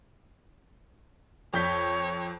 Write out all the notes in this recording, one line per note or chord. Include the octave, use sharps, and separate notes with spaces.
F2 C#5 G6 B6